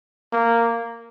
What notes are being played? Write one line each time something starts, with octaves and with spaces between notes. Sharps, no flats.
A#3